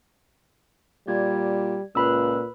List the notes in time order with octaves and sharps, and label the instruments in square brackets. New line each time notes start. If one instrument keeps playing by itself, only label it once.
[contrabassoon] A#2 [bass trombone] G3 [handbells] D5 G#6
[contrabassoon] C#2 [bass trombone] A#2 [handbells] B4 B5 E6